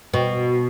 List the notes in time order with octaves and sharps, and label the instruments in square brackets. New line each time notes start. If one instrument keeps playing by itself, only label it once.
[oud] B2